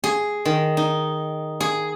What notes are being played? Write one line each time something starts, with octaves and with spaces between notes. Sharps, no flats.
G#4
D#3
D#4
G#4